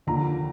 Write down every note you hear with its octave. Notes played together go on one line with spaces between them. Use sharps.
D#2 D3 F3 A#5